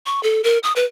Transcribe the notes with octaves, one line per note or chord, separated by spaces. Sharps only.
C#6
A4
A#4
D#6
B4